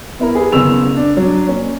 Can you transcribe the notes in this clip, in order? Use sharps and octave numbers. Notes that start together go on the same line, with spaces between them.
B3 E4 A#4
G4 G#4 B4
F#1 C#3 B3 E6 F7
D4
F#3 D4
A#3 C#4